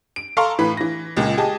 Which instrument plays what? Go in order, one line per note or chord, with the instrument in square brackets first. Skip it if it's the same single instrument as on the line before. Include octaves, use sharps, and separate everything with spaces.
[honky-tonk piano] D7
A4 F5 A#5 C6 C#6
A2 E3 B4 B5
E3 A#6
C#2 A#2 G#3
G4 G#4 D#5 A5